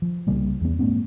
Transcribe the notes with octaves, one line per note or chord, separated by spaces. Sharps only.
F3
C2 C#3 G3 A#3
E2 B3
G#2 G#3 A#3 C4